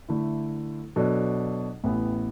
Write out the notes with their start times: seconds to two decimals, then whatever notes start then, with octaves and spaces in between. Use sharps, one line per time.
0.09 D3 A3 E4
0.96 B2 F#3 D4 A4
1.84 A1 A2 E3 B3 E4